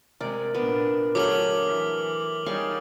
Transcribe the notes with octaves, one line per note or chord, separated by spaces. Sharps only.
C3 G#3 A#4 D5
A#2 B3 D4
D3 F#3 A3 G#4 D6 F6 F#7
E3
G3 D#4 G#4 C#5 F5 C#6